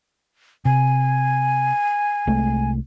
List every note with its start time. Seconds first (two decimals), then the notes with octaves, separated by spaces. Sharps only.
0.65 C3 G#5
2.27 C2 G#3 A3